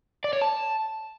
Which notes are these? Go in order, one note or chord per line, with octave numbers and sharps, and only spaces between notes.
D5
C#5
A5